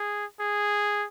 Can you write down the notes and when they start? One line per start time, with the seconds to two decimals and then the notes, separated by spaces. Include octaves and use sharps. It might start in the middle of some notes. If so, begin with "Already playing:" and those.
Already playing: G#4
0.40 G#4